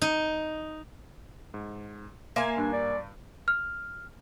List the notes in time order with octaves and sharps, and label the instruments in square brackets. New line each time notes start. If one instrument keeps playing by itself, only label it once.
[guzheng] D#4
[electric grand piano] G#2
[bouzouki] A#3 G#5 [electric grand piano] E5 F5 C6
[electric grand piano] G2 [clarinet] D4
[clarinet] D5
[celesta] F6